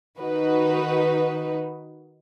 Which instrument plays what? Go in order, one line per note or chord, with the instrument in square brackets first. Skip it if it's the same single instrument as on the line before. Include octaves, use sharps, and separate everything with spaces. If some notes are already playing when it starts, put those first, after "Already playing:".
[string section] D#3 D#4 F#4 B4